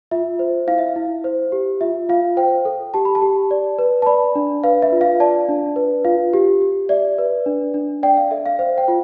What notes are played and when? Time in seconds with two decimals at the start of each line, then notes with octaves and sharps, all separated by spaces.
0.11 F4 E5
0.39 C5
0.67 E4 F5
0.78 E5
0.88 F5
0.96 E4
1.24 C5
1.52 G4
1.81 F4 E5
2.09 F4 F5
2.37 C5 G5
2.65 A4
2.94 G4 A5
3.05 B5
3.15 A5
3.22 G4
3.51 D5
3.79 B4
4.02 A5
4.06 D5 B5
4.35 D4
4.64 B4 F5
4.82 E5
4.92 F4
5.01 F5
5.20 D5 A5
5.48 D4
5.76 B4
6.05 F4 F5
6.34 G4
6.62 G4
6.89 D5 E5
7.18 B4
7.46 D4
7.74 D4
8.03 D5 G5
8.17 F5
8.31 A4 E5
8.46 F5
8.59 C5 F5
8.78 G5
8.88 F4